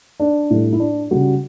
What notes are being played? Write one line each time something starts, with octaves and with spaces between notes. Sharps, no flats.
D4
A2 G3
E4
D4
C#3 G3 F#4